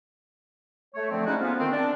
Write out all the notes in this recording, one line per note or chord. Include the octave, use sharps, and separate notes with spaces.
A3 C#5
D3 F3 A3 C4
G#3 A3 C#4 D#4 E4 F#4
F3 A#3 B3 C#4 F4 F5
D#3 C4
D4